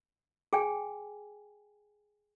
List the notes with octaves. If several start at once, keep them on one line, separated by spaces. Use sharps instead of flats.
G#4 G5 G#5